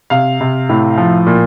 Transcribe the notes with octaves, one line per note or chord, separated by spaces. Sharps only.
C3 F5
C3
A2
F3
A#2